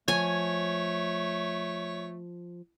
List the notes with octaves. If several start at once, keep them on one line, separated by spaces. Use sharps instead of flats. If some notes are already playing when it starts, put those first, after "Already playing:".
F3 A3 C#5 G#5